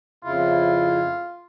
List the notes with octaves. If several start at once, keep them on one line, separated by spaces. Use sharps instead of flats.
F2 C#3 E4 F4